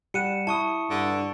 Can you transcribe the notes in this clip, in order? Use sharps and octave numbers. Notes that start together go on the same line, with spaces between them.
G3 F#5 C#7 D#7 E7
E4 A5 C#6 D#6
G2 D3